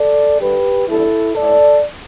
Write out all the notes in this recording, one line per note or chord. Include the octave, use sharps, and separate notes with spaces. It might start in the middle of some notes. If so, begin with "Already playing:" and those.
Already playing: A4 D5
G2 D3 G3 G4 B4
E2 D3 G3 E4 A4
A2 A3 A4 D5